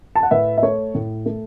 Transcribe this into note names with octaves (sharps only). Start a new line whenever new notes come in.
A5
F#5
A2 B4 E5
E5
A3 C#5
A2
A3